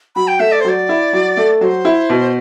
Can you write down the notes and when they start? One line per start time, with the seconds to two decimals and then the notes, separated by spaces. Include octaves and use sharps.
0.15 F#3 B5
0.28 G5
0.39 A3 E5
0.52 D5
0.61 C5
0.65 F#3 D5
0.89 E4
1.13 F#3
1.37 A3
1.61 F#3 C5 D5
1.85 E4
2.10 B2